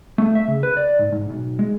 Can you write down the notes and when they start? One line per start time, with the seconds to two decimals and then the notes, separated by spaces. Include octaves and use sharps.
0.18 A3
0.35 E5
0.48 C#3
0.63 B4
0.77 D5
0.99 G#2
1.12 G#2
1.29 B1
1.59 G#3